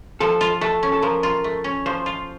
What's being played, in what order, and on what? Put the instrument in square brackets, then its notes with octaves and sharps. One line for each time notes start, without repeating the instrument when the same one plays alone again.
[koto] F3 [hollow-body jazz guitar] A4
[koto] F4
[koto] A3 [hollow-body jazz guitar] A4
[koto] C#4
[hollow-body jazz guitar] A4
[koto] F3 [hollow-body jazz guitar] A#4
[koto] F4
A3
C#4
[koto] F3 [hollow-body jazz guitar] C5
[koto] F4